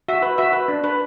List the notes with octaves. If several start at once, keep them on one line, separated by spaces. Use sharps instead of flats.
F#4 E5
B4
F#4 E5
B4
D4
B4